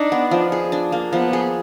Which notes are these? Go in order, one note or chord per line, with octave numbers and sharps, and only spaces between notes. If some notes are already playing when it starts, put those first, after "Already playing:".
Already playing: D4 D#4
B3
F3
G#4
D4
A#3
F3 B3
G#4